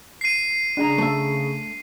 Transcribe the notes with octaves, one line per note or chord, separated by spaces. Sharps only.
C7 D#7
C#3 D4 G#4 A#5
A3 E5